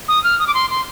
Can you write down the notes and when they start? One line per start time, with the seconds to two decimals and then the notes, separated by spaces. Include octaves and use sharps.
0.08 D#6
0.24 F6
0.40 D#6
0.47 D6
0.54 C6
0.70 C6